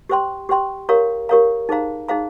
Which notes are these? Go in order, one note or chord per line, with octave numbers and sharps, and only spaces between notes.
G4 C5 G5 C6
G4 C5 G5 C6
G4 A#4 C#5 F5 A#5
G4 A#4 C#5 F5 A#5
D#4 G#4 C5 F5 A#5
D#4 G#4 C5 F5 A#5